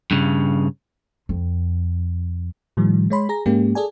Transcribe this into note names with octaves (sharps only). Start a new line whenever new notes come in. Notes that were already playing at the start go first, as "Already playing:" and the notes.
G2 C#3
F2
A2 D#3 F3 G3
G#3 C#5 B5 C6
G#4 A#5 A#6
G#2 G#3 A#3 C#4 G4
G#4 A4 D5 G#5